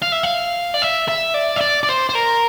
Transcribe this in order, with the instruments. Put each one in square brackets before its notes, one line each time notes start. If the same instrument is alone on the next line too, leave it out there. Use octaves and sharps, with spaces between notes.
[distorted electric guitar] F5
E5
F5
D5
E5
E5
D5
E5
D5
D5
C5
C5
A#4